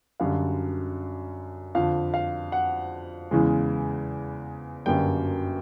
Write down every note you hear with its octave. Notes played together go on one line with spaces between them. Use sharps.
F#2 D3 G3 F5
F2 D3 F3 F5
F5
F#5
E2 C#3 E3 G#3
G1 F#2 D3 G3 A#3 G5